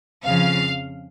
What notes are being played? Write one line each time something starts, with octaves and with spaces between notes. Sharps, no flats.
F2 C#3 F3 F5